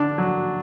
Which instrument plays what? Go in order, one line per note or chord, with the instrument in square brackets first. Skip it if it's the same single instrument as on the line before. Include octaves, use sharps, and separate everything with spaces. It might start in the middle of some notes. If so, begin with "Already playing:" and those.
Already playing: [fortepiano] D3 D4
F#3